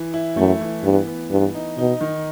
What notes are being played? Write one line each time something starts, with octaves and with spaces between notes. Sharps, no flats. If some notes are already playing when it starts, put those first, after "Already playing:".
Already playing: E3
E4
F#2 A3
E3
G2 B3
B3
G2 B3
D#4
B2 D#4
D#3